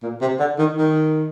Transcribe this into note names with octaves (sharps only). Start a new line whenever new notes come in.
A#2
C3
D3
D#3
D#3